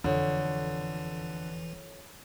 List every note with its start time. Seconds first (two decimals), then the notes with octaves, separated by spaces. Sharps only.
0.04 E1 F2 D3 E3 F4 A4 C#5